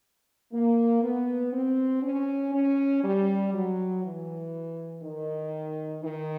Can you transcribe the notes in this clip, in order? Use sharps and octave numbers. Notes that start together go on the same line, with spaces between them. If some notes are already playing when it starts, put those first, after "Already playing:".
A#3
B3
C4
C#4
C#4
G3
F#3
E3
D#3
D#3